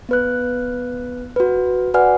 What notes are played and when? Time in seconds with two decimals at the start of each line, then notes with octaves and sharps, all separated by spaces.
0.09 B3 B4 F#6
1.36 F#4 B4
1.94 F#4 B4 D5 F#5 G#5 F6